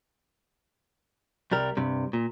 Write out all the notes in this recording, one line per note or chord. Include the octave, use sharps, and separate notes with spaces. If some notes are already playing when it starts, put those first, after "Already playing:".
C2 G3 A#4
G2 C3
A#2